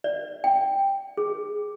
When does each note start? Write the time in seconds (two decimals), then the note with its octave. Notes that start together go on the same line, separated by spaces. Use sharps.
0.04 D5
0.44 G5
1.17 G#4